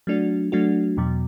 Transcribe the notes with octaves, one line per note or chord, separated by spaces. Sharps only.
F#3 A3 D4 F#4
F#3 A3 D4 F#4
E2 B2 F#3